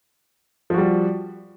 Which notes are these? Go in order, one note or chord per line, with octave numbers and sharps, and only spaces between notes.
F3 G3 F#4